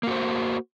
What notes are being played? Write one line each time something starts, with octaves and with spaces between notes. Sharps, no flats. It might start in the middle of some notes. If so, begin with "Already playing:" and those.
A#3 F#4 C5